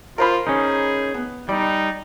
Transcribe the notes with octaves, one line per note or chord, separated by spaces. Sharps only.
F4 A#4 C5 B5
C#4 D#4 G#4
B3
G3 D#4 D5